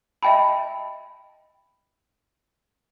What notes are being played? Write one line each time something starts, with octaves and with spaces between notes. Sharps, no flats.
D#5 E5 G5 A5 B5